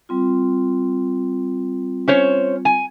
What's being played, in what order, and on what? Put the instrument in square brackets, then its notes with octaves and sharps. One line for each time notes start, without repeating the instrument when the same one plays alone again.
[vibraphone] G3 C4 F4
[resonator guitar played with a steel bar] C#4 C5 C#5
G#5